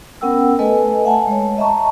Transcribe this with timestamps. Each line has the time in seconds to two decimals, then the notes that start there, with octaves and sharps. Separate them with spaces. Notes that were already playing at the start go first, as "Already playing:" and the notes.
0.21 B3 C#4 A#4 F#5 G5 E6
0.59 A3 A4 B4 D#5 G#5
1.05 E5 F#5 G#5 A5
1.27 G#3 C#5
1.57 D#5 E5 A5 A#5 C#6